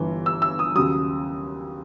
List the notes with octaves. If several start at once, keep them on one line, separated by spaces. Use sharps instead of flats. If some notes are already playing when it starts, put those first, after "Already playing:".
Already playing: G1 G2 E3
E6
E6
D#6
D#2 C#3 F#3 D#6